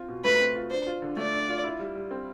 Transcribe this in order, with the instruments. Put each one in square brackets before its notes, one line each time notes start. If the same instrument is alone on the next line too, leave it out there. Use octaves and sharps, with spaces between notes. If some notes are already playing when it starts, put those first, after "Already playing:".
Already playing: [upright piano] C4 F4
B2
[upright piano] A3 [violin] B4
[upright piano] C4
F4
[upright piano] D4 [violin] C5
[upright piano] F4
D3
[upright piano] A3 [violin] D5
[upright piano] D4
F4
E4
G3
G3
C4